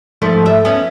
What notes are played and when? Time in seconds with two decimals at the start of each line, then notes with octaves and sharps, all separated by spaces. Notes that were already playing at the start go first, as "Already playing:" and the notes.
0.22 G#2 F3 A3
0.46 E5
0.65 B3 C#4